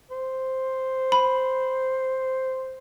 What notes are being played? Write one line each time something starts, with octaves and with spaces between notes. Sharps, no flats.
C5
B5